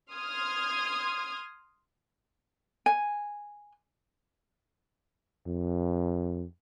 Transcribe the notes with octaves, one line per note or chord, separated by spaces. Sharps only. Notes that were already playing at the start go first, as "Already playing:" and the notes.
C6 D#6 F6 G#6
G#5
F2